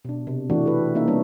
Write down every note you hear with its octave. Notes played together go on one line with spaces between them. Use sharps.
B2 D4
C3
E3 A3 D4 F#4
G4 A4 B4
A#3 C#4 D#4 E5
G3 B3 D4 A4 C#5